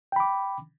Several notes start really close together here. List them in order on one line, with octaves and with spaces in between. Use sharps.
G5 B5 D6